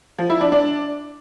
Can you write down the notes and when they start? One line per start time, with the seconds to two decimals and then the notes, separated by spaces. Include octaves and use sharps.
0.18 F3
0.30 E4
0.41 D4
0.52 D4